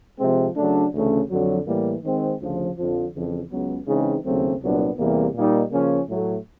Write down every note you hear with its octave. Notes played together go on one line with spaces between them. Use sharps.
C3 F3 G#3 C4
C#3 F#3 A3 D4
D2 C#3 E3 A3 C#4
F2 D3 F#3
A2 E3 G3 A#3
D#3 G#3 C4
D2 C#3 F3
F2 D3 F3
F2 C#3 E3
C#2 C#3 F#3 B3
C#3 E3 G#3 C4 D#4
D#2 C#3 F#3 A3 C4
C2 A#2 F#3 B3 D4
E2 C3 E3 G3 A#3
A#2 G3 A#3 D#4
C#3 F3 A#3 C#4
A2 F#3 A3